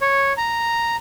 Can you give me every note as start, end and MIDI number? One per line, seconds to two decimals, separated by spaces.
0.01 0.33 73
0.37 0.96 82